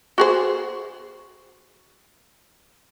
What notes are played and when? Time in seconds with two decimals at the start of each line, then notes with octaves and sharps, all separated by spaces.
0.18 F#4 G#4 C5